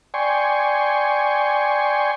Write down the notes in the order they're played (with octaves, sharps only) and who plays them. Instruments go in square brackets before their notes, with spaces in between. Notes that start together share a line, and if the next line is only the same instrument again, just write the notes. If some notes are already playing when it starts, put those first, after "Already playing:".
[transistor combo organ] D5 G5 G#5 C6 C#6